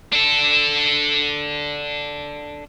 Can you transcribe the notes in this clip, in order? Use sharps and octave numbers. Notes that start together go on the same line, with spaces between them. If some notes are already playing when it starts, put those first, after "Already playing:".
D4 A4